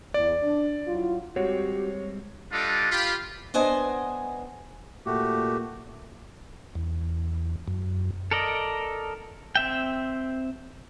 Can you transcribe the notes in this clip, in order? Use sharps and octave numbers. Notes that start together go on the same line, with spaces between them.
E2 D5
D4
F#3 E4 F4
G3 G#3 C4 F#4 G4 C#5
G3 D4 F4 A4 D#5 F#5
F4 G4 B5
B3 D4 C5 D#5 G#5
A#2 A3 F#4 G4
E2
F#2
A4 A#4 D5 D#5
C4 E5 G5